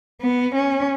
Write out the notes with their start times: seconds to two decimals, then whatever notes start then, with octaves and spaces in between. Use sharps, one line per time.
0.22 B3
0.55 C#4